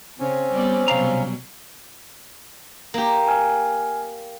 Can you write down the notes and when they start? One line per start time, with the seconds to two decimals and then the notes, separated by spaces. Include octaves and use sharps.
0.20 C#3 C4 C#4
0.52 G3 B3 D5
0.88 C2 B2 F#3 G3 F5 A#5
2.94 A#3 G4
3.28 G#5 F6